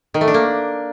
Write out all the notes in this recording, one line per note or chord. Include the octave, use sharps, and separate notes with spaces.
D#3
A3
D4
A#3